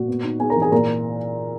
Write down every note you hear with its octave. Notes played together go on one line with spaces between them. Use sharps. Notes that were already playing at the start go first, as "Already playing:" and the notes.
Already playing: A#2 F#4
B3
D#4
B3 G#4 G#5
A#4 A#5
E3
G#4 G#5
A#2 A#4 A#5